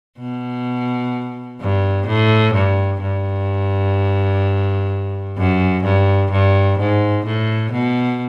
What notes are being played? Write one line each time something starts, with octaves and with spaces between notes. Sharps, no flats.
B2
G2
A2
G2
G2
F#2
G2
G2
G#2
A2
B2